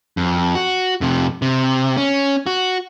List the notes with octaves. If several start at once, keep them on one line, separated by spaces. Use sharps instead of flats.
F2
F#4
F2 C3
C3
C#4
F#4